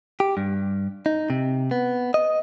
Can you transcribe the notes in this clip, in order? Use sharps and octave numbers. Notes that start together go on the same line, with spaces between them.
G4
G2
D#4
C3
B3
D#5